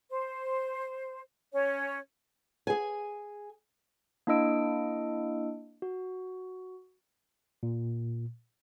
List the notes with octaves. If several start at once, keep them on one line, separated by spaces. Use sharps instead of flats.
C5
C#4 C#5
G#4 G#5
A#3 D4 E4 D#5 E6 D7
F#4
A#2